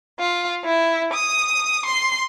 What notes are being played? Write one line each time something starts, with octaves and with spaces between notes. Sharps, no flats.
F4
E4
D#6
C6